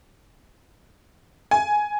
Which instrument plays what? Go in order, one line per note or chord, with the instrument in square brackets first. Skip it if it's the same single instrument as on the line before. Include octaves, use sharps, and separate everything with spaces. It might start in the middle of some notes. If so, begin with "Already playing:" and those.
[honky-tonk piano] G#5